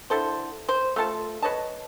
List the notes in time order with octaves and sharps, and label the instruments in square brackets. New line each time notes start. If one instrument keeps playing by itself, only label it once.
[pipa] D3 E4 A4 C5
C5
A3 F4 A4 A5
B4 C#5 D#5 A5